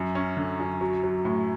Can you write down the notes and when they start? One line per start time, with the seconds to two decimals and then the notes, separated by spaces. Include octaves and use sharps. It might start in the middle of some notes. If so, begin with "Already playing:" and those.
Already playing: F#2 F#3
0.15 C#4
0.37 D3
0.60 F#2
0.81 F#3
1.03 F#3
1.25 A2